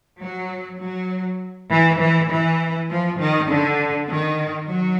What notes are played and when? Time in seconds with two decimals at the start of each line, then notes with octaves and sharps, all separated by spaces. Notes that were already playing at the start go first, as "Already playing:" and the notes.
0.21 F#3
0.81 F#3
1.71 E3
2.00 E3
2.31 E3
2.90 F3
3.19 D#3
3.50 D3
4.10 D#3
4.68 F#3